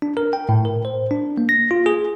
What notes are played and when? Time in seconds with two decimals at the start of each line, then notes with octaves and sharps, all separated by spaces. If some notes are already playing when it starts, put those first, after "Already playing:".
0.02 D4
0.17 A#4
0.33 G5
0.49 A2
0.65 A#4
0.85 C5
1.11 D4
1.38 A#3
1.49 A#6
1.71 F4
1.86 G#4